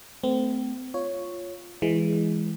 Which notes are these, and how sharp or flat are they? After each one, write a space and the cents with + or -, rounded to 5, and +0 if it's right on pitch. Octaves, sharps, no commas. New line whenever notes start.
A3 +0 C4 -35
F4 +0 C#5 +0
E3 +10 G#3 +0